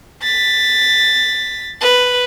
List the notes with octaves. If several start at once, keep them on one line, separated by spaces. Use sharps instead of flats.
A6 B6
B4